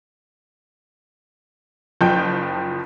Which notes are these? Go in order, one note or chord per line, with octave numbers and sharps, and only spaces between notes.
F#1 F3 G5 G6